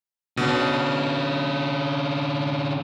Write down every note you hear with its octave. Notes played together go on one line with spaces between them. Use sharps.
B2 D3 C#4